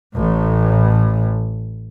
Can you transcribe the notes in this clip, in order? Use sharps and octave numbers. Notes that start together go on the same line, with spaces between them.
A1 A2